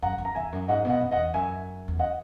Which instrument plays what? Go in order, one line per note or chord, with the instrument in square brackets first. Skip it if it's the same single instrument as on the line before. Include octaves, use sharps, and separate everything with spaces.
[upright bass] F#2 [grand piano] F#5 A#5
[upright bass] F#2
[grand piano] A#5
[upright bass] E2 [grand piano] E5 G#5
[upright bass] F#2
[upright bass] G#2 [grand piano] D#5 F#5
[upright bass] B2
[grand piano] D#5 F#5
[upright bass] F#2
[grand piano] D#5 F#5
[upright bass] E2
[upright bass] F#2 [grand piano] E5 G#5
[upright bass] E2
[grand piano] D#5 F#5